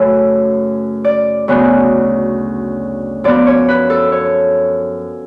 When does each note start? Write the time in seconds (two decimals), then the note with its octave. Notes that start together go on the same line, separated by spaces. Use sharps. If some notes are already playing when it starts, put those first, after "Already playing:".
Already playing: F#2 C#3 F#3 A3 A4 B4 C#5
1.04 D5
1.48 D2 C#3 F#3 B3
3.24 F#2 F3 B3 D5
3.47 C#5
3.68 B4
3.90 A4
4.12 C#5